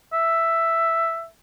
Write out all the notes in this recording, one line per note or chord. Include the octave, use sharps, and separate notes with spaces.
E5